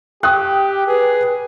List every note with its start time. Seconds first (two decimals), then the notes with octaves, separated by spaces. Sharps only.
0.23 G4 G5 D#6 F#6
0.87 G#4 B4